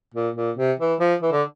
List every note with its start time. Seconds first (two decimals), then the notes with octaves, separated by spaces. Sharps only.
0.14 A#2
0.36 A#2
0.57 C3
0.79 E3
1.00 F3
1.22 E3
1.32 D3